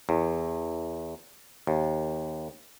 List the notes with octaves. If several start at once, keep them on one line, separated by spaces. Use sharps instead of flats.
E2
D#2